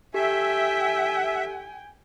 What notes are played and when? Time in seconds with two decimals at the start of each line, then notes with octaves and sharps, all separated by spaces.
0.14 G4 A4 E5 G5 G#5